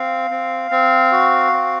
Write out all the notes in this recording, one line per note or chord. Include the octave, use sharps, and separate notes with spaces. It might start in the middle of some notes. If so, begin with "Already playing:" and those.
Already playing: C4 F5
C4
C4
F#4
C4